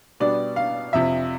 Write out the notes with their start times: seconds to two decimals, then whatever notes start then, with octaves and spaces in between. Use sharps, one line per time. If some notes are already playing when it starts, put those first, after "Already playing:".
0.20 B2 G3 B3 D4 D5
0.56 F5
0.93 F2 C3 F3 E5